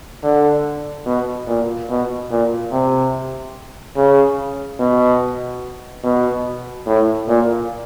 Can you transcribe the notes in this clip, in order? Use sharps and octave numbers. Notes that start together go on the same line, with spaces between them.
D3
B2
A#2
B2
A#2
C3
C#3
B2
B2
A2
A#2